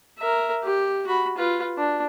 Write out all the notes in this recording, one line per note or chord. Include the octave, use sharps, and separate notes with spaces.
A#4 E5
G4
F#4 B5
F4 B4
D4